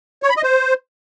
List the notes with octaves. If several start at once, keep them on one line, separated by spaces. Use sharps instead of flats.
C#5
B5
D#5
C5